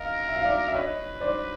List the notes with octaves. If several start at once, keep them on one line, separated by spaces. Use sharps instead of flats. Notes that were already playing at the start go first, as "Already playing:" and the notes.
Already playing: A#4 D#5 F5
E5
F5
D5 E5
E5
B4 C#5 D#5
C5 D5